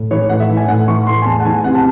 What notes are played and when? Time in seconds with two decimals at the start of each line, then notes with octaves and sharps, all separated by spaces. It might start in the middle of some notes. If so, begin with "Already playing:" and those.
Already playing: A2
0.11 E3 C#5
0.29 A2 F#5
0.40 E5
0.50 E3
0.57 G#5
0.68 A2 F#5
0.88 E3 C#6
1.06 A2 C6
1.22 G#5
1.26 E2 A5
1.40 F#5
1.45 E3 G#5
1.64 C3 F#5
1.75 A5